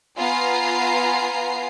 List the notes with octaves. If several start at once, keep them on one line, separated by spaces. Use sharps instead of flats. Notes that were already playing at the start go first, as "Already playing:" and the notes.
B3 F4 F5 G#5 A#5 C7